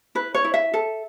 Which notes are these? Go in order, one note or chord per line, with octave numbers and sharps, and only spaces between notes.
E4 B4
C#5
E4
E5
A4